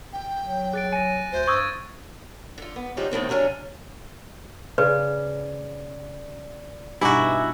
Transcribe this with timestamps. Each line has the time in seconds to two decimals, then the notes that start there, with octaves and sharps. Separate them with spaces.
0.13 G5
0.44 F#3
0.73 G#4 F#6 A6 D7
0.93 G#5 A#6 D7 D#7
1.32 D2 C5
1.47 G2 C#6 D#6 E6 G#6 A6
2.58 D3 F4
2.76 B3
2.97 F3 G3 G#3 C#4 D#4 F4
3.11 E2 A2 D#3 C4
3.29 C3 F#3 C#4 D4
4.78 C#3 B4 D5
7.01 G2 B2 D#4 E4 F#4 E5 G#5 D6